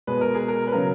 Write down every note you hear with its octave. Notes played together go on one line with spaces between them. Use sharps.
B2 G#3 B4
A#4
G#4
A#4
B4
C#3 F#3 A#4